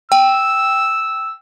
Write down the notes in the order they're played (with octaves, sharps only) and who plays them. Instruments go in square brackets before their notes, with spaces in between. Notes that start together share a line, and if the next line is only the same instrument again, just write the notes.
[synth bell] G5 [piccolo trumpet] E6